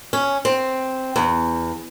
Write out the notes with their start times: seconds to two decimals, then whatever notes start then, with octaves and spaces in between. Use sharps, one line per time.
0.13 C#4
0.45 C4
1.16 E2